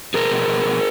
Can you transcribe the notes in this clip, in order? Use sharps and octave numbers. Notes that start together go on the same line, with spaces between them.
B2 G#4 A#4
B2
B2
B2